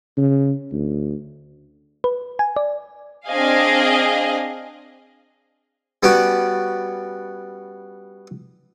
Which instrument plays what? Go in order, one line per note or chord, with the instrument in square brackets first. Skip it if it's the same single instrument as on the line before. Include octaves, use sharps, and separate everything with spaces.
[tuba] C#3
D2
[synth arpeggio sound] B4
G#5
D5
[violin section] C4 D4 G#4 D#5 F5 G#5
[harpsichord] G3 B3 C#4 F#4 A5 D6